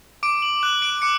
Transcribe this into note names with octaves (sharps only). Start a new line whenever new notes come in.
D6 D7
F#7
F#6 F#7
D7
D6 C#7